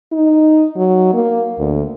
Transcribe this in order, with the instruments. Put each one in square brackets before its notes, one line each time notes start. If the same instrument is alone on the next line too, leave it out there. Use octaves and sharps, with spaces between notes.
[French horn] D#4
F#3
A#3
D2